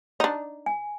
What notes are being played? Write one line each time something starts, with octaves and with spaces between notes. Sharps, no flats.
D4 D#4
G#5